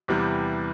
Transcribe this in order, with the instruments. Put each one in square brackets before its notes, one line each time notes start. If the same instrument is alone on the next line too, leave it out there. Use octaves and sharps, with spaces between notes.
[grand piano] E2 C3 E3 G3